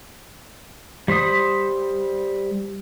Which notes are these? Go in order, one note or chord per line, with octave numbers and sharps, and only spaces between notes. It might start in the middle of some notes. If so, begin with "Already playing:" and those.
G3 C5 B5 D#6